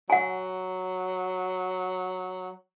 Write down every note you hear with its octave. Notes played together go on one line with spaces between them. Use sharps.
F#3 F#5 G#5